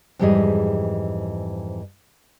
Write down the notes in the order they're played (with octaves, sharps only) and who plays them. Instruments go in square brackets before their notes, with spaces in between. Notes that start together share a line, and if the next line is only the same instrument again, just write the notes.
[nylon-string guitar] F2 G#2 E3 G3 G#4 D#5